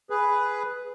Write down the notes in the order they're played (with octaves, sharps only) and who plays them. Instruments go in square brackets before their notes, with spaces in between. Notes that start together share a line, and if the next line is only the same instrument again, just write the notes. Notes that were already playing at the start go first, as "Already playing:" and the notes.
[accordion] G#4 B4